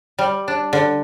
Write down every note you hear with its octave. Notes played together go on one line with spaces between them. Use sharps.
G3
D4
D3